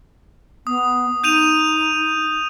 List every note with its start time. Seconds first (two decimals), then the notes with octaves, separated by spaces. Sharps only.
0.67 B3 D#6
1.24 D#4 G6 D#7 F7